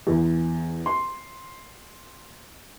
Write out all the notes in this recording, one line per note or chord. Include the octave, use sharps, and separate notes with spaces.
E2
C6